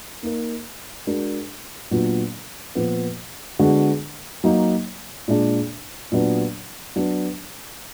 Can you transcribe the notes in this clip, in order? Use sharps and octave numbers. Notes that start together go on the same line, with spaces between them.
A#3 D#4 A#4
G#3 D4 F#4 A#4
A#2 F#3 B3 D4 F4
A#2 F3 B3
D3 G#3 B3 D4 F#4
F#3 A#3 D#4
A#2 G#3 D4
A#2 F#3 B3 D4 F#4
F#3 B3 D4